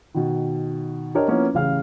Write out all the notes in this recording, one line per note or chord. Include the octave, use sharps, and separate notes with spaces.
B2 D#3
D4 G4 A#4 C#5 D#5
F3 A#3 B3 C#4 E4
A1 C#3 F5 F6